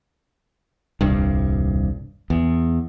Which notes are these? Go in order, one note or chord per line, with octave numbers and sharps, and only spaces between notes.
D#1 C2 G2
E2